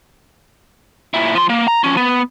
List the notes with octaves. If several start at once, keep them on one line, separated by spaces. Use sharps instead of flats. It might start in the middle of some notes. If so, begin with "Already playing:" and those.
A#2 E4
F3 C6
A#3
A#5
F3 C#4
B3